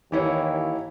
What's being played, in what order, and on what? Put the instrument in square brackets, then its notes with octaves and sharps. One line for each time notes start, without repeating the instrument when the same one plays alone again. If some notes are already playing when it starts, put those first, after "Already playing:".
[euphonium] D#2 [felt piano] E3 E4 C#5